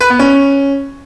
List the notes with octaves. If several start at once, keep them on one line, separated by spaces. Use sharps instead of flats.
B4
B3
C#4